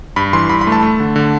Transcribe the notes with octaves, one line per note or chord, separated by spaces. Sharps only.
G2 B5
E3 C6
G2 B5
B5
A3
A5
A3
D3
D3